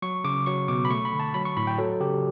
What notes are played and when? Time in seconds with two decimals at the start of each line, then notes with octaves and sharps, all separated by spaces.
0.02 F#3 C#6
0.24 C#3 D6
0.46 F#3 C#6
0.68 B2 D6
0.85 B5
0.90 A3 C#6
1.05 B5
1.13 D3
1.20 A5
1.34 F#3 B5
1.45 C#6
1.57 A2 B5
1.67 G5
1.78 F#3 A4
2.00 C#3 G4